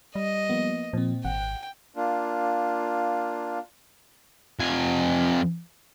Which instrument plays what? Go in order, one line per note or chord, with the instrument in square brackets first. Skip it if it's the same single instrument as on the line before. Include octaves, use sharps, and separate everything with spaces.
[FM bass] G3 [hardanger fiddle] D#5
[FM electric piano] F3 A#3 B3
[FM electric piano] A#2 C4 [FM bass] F3
[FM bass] G#1 [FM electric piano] F#5 [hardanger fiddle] G5
[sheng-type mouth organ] A#3 D4 F4
[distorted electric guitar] F2 G#5